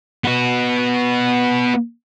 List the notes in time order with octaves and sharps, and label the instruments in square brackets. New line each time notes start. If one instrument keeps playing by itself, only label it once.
[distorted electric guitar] B3 F#4